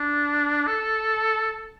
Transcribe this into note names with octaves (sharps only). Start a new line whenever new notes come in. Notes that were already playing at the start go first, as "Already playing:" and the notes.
Already playing: D4
A4